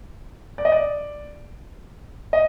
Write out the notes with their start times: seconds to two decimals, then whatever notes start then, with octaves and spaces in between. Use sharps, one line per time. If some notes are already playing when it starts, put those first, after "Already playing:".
0.58 D5
0.65 D#5
0.72 D5
2.33 D#5